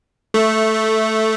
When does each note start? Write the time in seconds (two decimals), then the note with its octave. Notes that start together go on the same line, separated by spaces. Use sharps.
0.34 A3